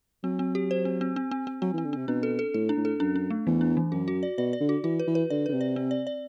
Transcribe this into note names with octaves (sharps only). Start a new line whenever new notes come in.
F#3 C4
C4
G4
C5
C4
C4
C4
C4
C4
F#3 C4
E3
C4
D3
C3 C4
B2 D4
A4
A4
A2 A4
D4
A2
A4
F#2 D4
D4
A3
E2 E3
D4
E3
F#2 F#4
F#4
D5
B2 D5
D5
D3
F#4
E3 F#4
B4
E3
B4
D3 D5
D3 B4
C3
D5
C4
D5
D5